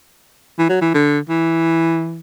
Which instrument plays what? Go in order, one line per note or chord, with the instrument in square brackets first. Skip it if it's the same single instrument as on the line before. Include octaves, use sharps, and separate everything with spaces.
[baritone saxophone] E3
F#3
E3
D3
E3